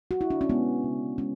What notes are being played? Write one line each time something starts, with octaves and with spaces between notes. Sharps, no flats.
F#4
E4
D4
C#4
G#3 B3
C#3
G#3 C#4